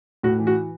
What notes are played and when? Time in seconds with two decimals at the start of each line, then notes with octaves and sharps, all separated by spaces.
0.23 A2 F#4
0.39 E3
0.47 F#4